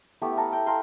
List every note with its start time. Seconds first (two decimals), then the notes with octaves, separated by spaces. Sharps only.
0.22 A3 B3 E4 G4
0.37 A4 A#4 A5
0.53 G5
0.66 A#4 F5 G5 C6